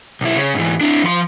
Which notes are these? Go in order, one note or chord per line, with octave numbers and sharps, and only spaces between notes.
B1 E4
C#3
G#2 E3
D4 E4
F3 C6